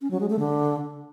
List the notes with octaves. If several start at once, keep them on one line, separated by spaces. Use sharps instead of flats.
C#4
F#3
G#3
A3
D3